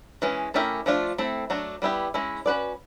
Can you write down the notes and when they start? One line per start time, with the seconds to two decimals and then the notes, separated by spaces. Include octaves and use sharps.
0.22 E3 G#3 C#4
0.54 A3 C#4 E4 G4 A#4
0.86 F3 A3 D4 F4
1.18 A3 C4 E4 A4
1.50 F#3 A3 D4
1.82 G3 B3 E4 G4
2.14 G#3 C#4 E4
2.46 C#4 F#4 B4 D5